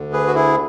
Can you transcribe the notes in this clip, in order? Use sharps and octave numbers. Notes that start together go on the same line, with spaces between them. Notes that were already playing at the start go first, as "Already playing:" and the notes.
Already playing: D2 D3
G#4 B4
F#4
E4 G#4